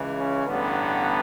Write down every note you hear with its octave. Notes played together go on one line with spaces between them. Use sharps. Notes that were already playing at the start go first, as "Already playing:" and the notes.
Already playing: C#2 C#3 E3
C#4
A1 G2 D3 B3